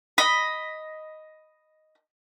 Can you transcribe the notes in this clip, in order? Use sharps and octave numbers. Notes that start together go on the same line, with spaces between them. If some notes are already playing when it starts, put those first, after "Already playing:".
D#5 B5